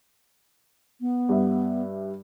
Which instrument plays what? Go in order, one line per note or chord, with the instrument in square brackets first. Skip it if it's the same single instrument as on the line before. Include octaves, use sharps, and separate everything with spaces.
[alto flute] B3
[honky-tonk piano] G2 E5